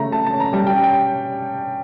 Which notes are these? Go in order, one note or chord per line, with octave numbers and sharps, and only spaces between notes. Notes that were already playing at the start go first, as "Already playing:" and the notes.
Already playing: C#3 A3 A#5
A3 A5
A5
C#4
A#5
G3 A5
G5
C#4
G5